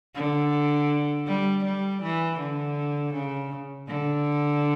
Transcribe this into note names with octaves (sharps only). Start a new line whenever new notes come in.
D3
G3
G3
E3
D3
C#3
D3